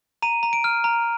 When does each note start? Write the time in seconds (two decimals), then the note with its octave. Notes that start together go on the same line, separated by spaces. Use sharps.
0.22 A#5 D#7
0.43 A#5
0.53 D7
0.64 F6
0.84 A#5